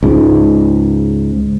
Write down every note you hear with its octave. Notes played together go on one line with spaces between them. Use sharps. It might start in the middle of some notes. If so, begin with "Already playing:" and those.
C#2 G#2